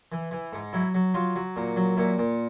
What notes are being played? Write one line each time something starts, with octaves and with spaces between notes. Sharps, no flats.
E3
E3
G#2
F#3 E4
F#3
F#3 F4
F#3
A#2
F#3
A#2 E4
A#2